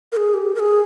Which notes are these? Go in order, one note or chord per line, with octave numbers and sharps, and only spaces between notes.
A#4
G#4
G4
A#4
G#4